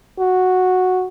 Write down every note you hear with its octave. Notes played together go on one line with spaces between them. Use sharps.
F#4